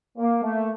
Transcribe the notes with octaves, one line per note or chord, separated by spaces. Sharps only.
A#3
A3